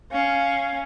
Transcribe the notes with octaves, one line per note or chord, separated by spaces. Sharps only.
C#4 F5